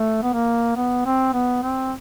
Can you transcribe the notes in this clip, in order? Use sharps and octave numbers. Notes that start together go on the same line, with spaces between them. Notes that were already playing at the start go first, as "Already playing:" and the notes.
Already playing: A3
B3
A#3
B3
C4
B3
C4